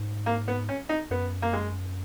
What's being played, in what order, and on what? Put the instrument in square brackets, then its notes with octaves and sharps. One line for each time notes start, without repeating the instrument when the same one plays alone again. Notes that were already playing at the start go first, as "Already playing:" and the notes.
Already playing: [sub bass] G#2
[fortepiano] A#3
B3
C#4
D#4
[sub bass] F#2 [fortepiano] B3
[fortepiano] A#3
G#3